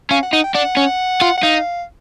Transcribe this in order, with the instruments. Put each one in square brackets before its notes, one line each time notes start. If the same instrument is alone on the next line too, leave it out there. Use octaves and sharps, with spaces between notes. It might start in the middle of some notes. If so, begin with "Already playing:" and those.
[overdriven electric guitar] C#4 [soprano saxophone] F5
[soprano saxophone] F#5
[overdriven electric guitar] D#4 [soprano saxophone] F#5
[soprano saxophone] G5
[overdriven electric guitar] D4 [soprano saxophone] F#5
[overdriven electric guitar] C#4
F4
[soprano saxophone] F#5
[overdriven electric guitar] D#4 [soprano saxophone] F5